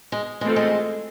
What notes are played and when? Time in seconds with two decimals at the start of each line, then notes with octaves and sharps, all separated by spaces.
0.12 G#3
0.41 E3 G#3 A3 C4 F4 A4
0.56 G#3